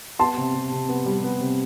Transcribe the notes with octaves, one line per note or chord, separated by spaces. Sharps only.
B3 A5 C6
C3
C3
C3
B3
G3
B3
C3